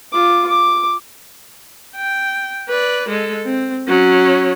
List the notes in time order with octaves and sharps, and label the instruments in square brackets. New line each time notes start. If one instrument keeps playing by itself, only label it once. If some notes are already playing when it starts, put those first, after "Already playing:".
[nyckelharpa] F4 D6
D6
[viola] G5
B4 D5
G#3 A4
C4
F#3 C#4